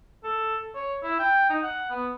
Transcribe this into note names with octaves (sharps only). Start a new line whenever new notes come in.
A4
C#5
E4
G5
D#4
F#5
B3